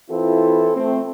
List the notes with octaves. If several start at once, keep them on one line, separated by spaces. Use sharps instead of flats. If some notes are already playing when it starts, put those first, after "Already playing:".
E3 C4 E4 F4 A4
A3 C4